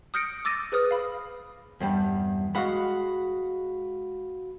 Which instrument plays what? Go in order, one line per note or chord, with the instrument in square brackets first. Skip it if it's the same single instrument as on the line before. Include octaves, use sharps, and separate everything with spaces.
[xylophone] D#6 F6 G6 A#6 C#7 D7
D6 E6 A6 A#6 D#7
G#4 B4 C5 D#6 F6
F5 B5
[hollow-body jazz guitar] E2 G2 G3
[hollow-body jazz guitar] G#3 F#5 [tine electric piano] F#4 F5 B5